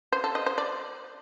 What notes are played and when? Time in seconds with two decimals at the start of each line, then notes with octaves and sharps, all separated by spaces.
0.12 C5
0.24 A4
0.35 D#5
0.46 C5
0.58 D5